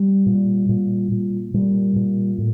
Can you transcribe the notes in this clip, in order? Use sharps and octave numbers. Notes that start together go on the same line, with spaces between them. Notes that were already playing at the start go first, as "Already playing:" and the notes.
Already playing: G3
A#2
A#2
A#2
A#2 G3
A#2
A2